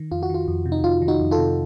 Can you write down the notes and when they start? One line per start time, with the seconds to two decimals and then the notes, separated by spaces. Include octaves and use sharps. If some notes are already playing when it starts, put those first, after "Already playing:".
Already playing: D#3
0.12 F2 F4
0.23 F#4
0.30 D#3 F4
0.48 F2
0.66 C3
0.72 D#4
0.84 F2 F4
1.02 D#3
1.08 D#4 F#4
1.20 F2
1.31 F4 A4
1.38 C3